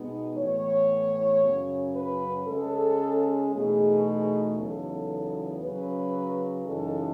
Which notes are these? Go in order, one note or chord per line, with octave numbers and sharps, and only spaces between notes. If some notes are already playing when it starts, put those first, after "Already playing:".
Already playing: B2 G#3 B3 D#4
A2 E3 B3 C#5
F#2 C#3 F#3 C#4
B4
C#3 G#3 C#4 A4
E2 B2 A3 D#4 G#4
G#4
E2 C#3 F#3 B3 D#4 A4
C#3 F#3 C#4 B4
F#2 C#3 E3 G#3 D#4 A4